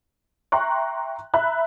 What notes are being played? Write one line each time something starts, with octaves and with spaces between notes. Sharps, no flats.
E5 G5 A#5 C6 C#6 F#6
E5 A#5 B5 F#6